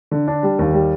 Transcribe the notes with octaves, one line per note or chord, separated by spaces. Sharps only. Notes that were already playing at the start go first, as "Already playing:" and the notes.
D3
D4
G3
D#2
G3